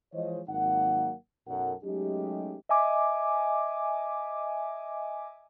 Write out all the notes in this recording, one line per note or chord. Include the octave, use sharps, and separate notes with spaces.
E3 F3 G#3 C5 C#5 D#5
G#1 F#3 A#3 D#4 F#5
B1 F#2 A4 A#4 F#5
F#3 G#3 A3 C#4 D#4 G4
D#5 E5 G#5 D6